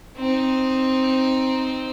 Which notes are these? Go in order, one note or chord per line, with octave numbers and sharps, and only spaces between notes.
C4 D#4